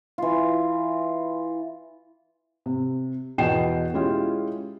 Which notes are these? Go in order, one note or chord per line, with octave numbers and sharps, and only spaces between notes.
E3 F4
C3
E2 B2 D#5 G5 C7 E7
G#3 C#4 E4 F4 G4